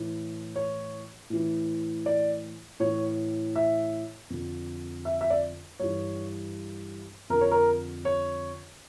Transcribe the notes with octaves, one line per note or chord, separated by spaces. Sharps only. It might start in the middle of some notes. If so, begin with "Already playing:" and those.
Already playing: A2 E3
C#5
A2 E3
D5
A2 E3 C#5
E5
F2 D3
E5
E5
D5
G2 E3 C#5
F2 D3 A#4
C#5
A#4
C#5